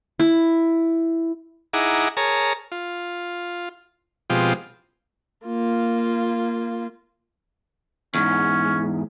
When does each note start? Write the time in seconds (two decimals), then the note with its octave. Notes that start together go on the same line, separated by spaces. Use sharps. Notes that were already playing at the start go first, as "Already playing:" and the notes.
0.20 E4
1.73 D#4 E4 G#4 F#5 A#5 D6
2.17 G#4 A#4 C#5 A5 A#5
2.72 F4
4.30 B2 F3 G#3 C4 F4 G4
5.46 A#3 F4
8.15 E2 G#2 C#4